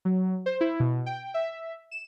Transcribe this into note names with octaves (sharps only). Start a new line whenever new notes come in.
F#3
C5
E4
B2
G5
E5
E7